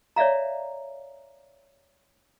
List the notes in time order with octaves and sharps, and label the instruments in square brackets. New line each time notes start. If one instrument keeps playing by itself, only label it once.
[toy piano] C#5 D5 E5 F5 A#5